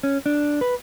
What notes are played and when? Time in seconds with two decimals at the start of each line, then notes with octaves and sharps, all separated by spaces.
0.03 C#4
0.26 D4
0.61 B4